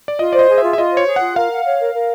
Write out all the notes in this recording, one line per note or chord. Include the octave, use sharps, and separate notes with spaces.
D5
F4 D#5
C5 D5
D#5
G#4
E5
F4
E5
F4 D#5
C5 C#5
G#4
F#5
F4
A#4 F5
F#5
C#5
A#4
A#4